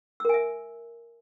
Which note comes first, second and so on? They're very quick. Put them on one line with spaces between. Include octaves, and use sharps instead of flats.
E6 A#4 G#5 E5